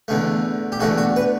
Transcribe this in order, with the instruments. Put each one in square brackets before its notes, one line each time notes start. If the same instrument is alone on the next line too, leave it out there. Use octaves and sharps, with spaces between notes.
[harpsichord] E2 D3 A3
G4
E2 D3 A3 F#4
F#4
B4